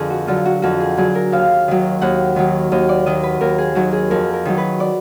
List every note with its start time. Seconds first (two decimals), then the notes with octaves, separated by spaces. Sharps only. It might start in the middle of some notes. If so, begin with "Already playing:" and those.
Already playing: F2 D3 G#4 A#4
0.10 F#4
0.27 D3 F#3 F4
0.45 F#4
0.62 F2 F#4
0.80 G#4
0.97 D3 F#3 G#4
1.15 A#4
1.32 D#2 F5
1.68 D#3 F#3
2.02 D#2 F#5
2.36 D#3 F#3
2.72 D#2 D#5
2.89 D5
3.06 D#3 F#3 D#5
3.23 B4
3.41 D#2 A#4
3.58 G#4
3.75 D#3 F#3 F#4
3.93 G#4
4.10 F2 A#4
4.33 A#4
4.45 D#3 F#3
4.58 B4
4.80 D5